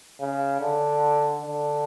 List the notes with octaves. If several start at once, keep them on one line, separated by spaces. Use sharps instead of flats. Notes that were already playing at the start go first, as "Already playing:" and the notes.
C#3
D3
D3